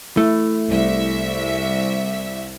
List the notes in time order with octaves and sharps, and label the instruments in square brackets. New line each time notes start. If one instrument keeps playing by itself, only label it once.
[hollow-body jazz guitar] A3 [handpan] E4
[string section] C2 E5